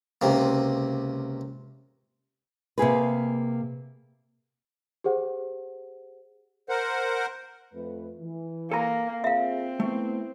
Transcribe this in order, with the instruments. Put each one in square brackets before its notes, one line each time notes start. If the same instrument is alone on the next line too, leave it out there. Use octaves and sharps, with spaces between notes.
[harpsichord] C#2 C3 A#3
[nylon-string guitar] C3 A#3 G#4 B4
[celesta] G4 G#4 C5 F#5
[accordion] A#4 C5 F#5
[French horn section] F2 A3 B4
E3
[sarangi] A#3 [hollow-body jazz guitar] A4 G#5 A#5
[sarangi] C4 [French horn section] F4 G#4 [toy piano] E5 F5
[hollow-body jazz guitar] A3 [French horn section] B3 E4